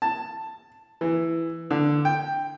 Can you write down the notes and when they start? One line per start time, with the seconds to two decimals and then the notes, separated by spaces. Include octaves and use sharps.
0.02 A5
1.01 E3
1.71 D3
2.05 G5